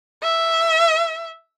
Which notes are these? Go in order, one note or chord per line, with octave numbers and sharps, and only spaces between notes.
E5